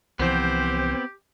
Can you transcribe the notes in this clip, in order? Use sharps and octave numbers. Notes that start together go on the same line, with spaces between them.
C2 E3 F3 B3 C4 G4 C5